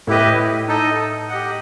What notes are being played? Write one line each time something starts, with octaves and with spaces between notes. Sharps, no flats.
A2 E4 G4 B4 D#5
D#4 A4 D#5
G4 D#5 F#5